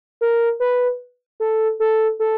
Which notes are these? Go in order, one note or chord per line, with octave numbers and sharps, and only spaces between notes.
A#4
B4
A4
A4
A4